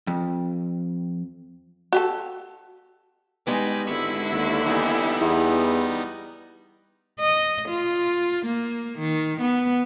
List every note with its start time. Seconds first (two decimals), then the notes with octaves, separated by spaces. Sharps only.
0.07 F2
1.93 F#4 G4 A4
3.47 G3 G#3 B3 D#4 G#5 B5 D6
3.87 G#1 D3 E4 B5 C#6
4.32 D#2
4.66 E3 G3 B3 D#4
5.21 E2
7.20 D#5
7.69 F4
8.45 A#3
8.99 D#3
9.41 B3